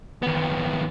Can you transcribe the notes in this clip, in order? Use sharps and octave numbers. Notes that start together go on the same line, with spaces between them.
D#2 B3